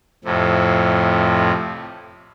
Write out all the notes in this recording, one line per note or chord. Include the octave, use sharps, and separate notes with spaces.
F2 A2 C3